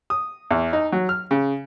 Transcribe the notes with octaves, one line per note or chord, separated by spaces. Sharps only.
D#6
E2
D#4
F#3
F6
C#3